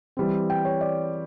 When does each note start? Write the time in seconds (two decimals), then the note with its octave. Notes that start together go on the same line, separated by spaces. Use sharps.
0.17 E3 G3 C4
0.50 G5
0.65 C#5
0.81 D5